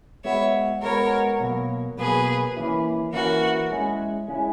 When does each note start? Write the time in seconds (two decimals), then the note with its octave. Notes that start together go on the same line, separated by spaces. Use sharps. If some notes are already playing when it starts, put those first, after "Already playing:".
0.24 G#3 B3 F#4 B4 C#5 E5
0.82 G#3 B3 F#4 A#4 B4 C#5
1.40 B2 F#3 A#3
1.98 B2 F#3 A#3 G#4 B4
2.56 E3 A#3 C#4 E4 B4
3.12 E3 A#3 C#4 E4 F#4 A#4 B4
3.70 G#3 C#4 E4 G#4
4.28 G#3 C#4 E4 G#4